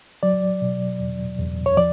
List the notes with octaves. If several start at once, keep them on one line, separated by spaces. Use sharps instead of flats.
F#3 D5
B2
E2
E2
C#5
F3 D5